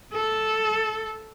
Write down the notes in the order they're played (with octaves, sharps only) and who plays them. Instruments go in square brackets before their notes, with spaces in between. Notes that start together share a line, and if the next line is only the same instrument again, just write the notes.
[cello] A4